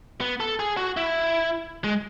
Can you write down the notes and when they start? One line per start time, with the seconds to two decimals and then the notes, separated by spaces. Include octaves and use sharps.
0.21 B3
0.40 A4
0.59 G#4
0.77 F#4
0.97 E4
1.84 G#3